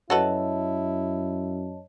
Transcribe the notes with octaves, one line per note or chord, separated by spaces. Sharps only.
F#2 E4 F#4 A4 B4 C#5 D#5 A5